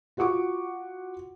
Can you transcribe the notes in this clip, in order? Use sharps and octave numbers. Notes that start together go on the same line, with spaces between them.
F4 F#4 F#5 C#6 D6